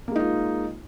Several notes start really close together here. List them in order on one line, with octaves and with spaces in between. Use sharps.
A#3 G#3 D#4 F4